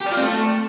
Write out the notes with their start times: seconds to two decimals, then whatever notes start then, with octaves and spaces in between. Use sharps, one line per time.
0.01 G4
0.06 D5
0.11 F4
0.17 C4
0.22 A3